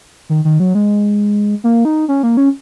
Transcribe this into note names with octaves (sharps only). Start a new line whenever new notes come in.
D#3
D#3
F#3
G#3
A#3
D#4
C#4
A#3
C#4